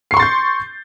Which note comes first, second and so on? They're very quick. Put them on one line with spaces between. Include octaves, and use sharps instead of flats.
C7 C#6 C6 A6 G6